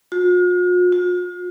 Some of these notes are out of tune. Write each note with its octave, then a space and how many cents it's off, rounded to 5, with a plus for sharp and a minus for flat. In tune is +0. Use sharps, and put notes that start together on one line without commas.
F4 +45
F4 +40